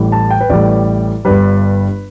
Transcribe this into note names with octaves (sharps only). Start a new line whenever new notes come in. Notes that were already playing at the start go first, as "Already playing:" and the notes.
Already playing: A1 A2 E3 G3
A5
G5
B4
A1 A2 E3 G3 D5
G1 G2 G3 B4